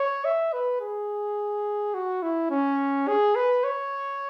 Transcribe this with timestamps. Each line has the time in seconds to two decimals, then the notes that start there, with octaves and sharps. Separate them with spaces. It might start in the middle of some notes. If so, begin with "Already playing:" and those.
Already playing: C#5
0.25 E5
0.53 B4
0.81 G#4
1.94 F#4
2.22 E4
2.50 C#4
3.08 G#4
3.35 B4
3.64 C#5